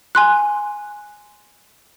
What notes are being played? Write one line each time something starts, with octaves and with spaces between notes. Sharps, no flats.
G#5 C6 F#6